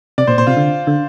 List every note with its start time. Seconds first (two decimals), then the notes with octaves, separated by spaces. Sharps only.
0.18 C3 D5
0.27 A#2 C5
0.38 A#2 C5
0.47 C3 F4
0.57 D3
0.87 D3